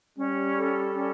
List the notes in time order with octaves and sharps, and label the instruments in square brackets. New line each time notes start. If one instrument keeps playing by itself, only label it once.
[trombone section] G3 [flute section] C#4
[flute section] A4
C#4